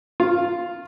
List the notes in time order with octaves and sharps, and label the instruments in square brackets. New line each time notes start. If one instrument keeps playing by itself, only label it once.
[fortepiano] F4